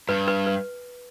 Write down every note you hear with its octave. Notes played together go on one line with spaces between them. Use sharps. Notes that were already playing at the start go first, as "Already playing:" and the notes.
G2 B4
B4
B4